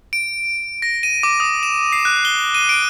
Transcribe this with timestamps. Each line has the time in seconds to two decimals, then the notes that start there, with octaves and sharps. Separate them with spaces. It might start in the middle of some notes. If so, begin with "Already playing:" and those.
0.13 D7
0.82 A#6
1.03 D#7
1.23 D6
1.40 D#6
1.63 E7
1.92 C7
2.05 F#6
2.25 G7
2.55 D#7
2.69 D7